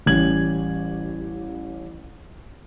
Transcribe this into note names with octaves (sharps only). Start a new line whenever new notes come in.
A1 G3 C#4 G#6 F#7